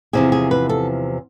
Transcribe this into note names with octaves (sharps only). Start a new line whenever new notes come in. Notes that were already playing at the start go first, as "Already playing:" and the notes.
E2 C3 F3 G#4
G#4
B4
A4